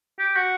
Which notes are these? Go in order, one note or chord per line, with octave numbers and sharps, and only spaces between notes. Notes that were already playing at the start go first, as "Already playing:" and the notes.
G4
F#4